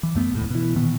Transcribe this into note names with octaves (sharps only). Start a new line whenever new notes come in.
E3
F#2 A3 B3
D#1 C#2 A2
B2 E3
A#2 D#3 E3 B3